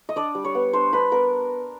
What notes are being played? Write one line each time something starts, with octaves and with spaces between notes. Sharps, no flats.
D#5
D4 D5
G3
C#5
B3
D4 C5
D4 B4
B3 A#4